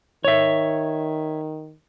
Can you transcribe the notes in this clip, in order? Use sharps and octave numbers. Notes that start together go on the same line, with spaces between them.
D#3 C#5 E5